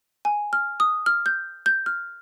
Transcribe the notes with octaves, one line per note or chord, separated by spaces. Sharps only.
G#5
F6
D#6
F6
G6
G6
F6